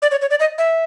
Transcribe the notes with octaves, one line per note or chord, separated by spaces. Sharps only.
D5
C#5
C#5
D5
D#5
E5